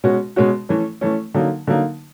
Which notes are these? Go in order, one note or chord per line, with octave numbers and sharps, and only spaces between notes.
B2 G#3 C#4 F#4
B2 G#3 C#4 F#4
E3 A3 C#4
E3 A3 C#4
D3 F#3 A#3 D#4
D3 F#3 A#3 D#4